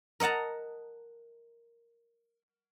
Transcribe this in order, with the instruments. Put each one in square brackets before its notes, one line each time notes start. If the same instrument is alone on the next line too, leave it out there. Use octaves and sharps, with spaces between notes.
[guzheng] A#4 D#5 F#5 A5 A#5